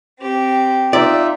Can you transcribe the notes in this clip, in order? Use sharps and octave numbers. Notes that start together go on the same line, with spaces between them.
C4 G4
D#4 F4 D5 E5